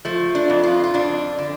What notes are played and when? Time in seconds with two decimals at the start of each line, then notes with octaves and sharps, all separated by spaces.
0.05 F3 A3
0.35 D4
0.50 F2
0.64 F4
0.84 F4
0.94 F2 D4
1.38 D3